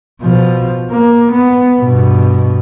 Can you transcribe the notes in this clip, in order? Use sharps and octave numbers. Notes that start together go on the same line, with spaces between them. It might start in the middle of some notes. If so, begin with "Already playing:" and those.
B2 F3
A#3
B3
G2 B2